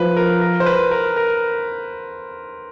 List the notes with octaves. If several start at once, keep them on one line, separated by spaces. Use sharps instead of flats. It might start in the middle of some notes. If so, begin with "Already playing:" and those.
Already playing: F3 B4
A#4
A#4
C5
B4
A#4
A#4